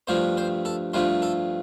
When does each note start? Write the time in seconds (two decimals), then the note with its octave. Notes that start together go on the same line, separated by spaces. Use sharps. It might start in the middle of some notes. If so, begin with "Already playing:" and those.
0.07 G2 F3 A3 C5
0.37 C5
0.65 A4
0.93 G2 F3 A3 C5
1.22 A4